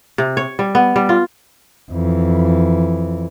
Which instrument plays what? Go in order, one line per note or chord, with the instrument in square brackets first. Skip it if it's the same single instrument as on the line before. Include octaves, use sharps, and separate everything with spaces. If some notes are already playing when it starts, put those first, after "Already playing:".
[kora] C3
C#5
G3
B3
G3
F4
[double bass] F2 E3